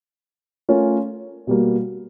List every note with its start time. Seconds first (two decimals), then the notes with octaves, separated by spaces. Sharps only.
0.69 A3 C#4 F4 A#4 C#5
1.47 B2 G3 A#3